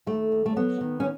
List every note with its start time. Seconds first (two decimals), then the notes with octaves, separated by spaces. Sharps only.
0.06 D#2 A3
0.32 D#2
0.46 A3
0.56 F#3 B3
0.81 D#3
1.00 C#4